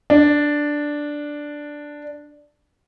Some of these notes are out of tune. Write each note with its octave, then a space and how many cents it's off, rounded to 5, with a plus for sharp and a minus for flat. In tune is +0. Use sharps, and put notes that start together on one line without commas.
D4 +0